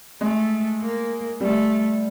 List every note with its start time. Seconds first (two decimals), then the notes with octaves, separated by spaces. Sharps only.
0.21 G#3 A3
0.80 A#3
1.41 G3 A3